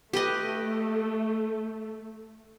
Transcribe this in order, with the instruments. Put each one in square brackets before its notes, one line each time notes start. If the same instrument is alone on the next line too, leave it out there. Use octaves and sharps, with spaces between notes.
[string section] A3 [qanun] G4 B4 D#5